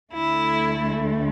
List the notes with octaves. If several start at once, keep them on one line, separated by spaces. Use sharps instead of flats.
D2 D3 A3 E4